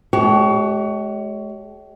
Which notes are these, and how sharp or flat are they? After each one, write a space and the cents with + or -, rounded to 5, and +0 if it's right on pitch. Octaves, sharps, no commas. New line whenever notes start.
G#3 +40 G4 -30 C#5 +25